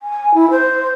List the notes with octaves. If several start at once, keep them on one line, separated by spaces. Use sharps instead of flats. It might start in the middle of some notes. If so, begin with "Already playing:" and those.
G#5
E4
C5